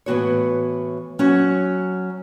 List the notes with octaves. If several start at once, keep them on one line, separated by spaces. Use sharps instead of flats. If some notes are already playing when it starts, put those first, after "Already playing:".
A2 E3 B3 F#4 C#5
F#3 C#4 F#4 C#5